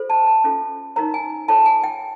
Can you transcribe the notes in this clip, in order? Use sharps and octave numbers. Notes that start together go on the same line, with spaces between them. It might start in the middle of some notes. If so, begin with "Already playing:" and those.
Already playing: F4 A4 C5
A5
A5
C#4 F4 A4
D#4 F#4 A#4 C#5 A#5
G#5
F4 A4 C#5 A5
G#5
G5